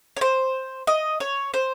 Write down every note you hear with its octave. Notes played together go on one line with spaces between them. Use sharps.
C#5
C5
D#5
C#5
C5